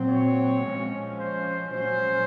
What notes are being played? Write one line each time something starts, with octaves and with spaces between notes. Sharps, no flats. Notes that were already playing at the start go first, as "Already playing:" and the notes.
Already playing: A#2 F#3 C4
C#5
F3 G#3 C#4
C5
A#2 F#3 C#4 C5